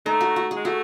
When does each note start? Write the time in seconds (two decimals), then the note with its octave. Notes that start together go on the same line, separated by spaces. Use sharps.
0.06 A3 D#4
0.21 F#4
0.36 F#4
0.51 G#4
0.56 G#3
0.65 A3 F#4